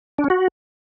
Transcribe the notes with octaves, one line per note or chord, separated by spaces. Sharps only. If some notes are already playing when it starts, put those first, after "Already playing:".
D4
C#4
F#4